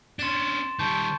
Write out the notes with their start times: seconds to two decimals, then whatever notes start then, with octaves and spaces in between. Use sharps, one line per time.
0.19 C#4 D4 C6 A6 E7
0.79 D#3 G3 A5 C#6 G6